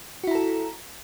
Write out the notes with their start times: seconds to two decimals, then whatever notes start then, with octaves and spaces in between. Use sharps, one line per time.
0.24 F#4
0.27 E4
0.31 A#5
0.35 A4